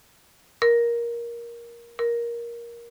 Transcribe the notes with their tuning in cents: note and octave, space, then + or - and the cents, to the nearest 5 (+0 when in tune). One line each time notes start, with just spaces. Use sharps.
A#4 +15
A#4 +15